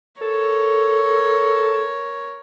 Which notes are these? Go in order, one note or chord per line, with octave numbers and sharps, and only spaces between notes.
A4 A#4 C#5